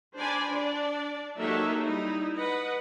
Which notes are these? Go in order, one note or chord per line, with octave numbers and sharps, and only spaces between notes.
D4 C5 D5 G#5 B5 C6
D4 D5
F#3 A#3 D#4 G4 A4 E5
G3 D#4 E4
B4 D#5 F#5